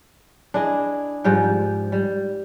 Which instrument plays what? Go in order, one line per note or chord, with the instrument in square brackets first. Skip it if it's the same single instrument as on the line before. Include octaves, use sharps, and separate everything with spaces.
[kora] D4 E4 G#4 D#5
G#2 F3 G3 G5
G3